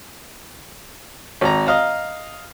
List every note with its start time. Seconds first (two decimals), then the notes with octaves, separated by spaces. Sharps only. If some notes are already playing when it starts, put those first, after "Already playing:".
1.41 G#1 A#5
1.67 D#5 F5 A#5